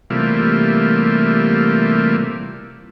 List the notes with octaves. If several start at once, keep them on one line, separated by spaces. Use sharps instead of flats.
C3 E3 G3 A3 A#3 F4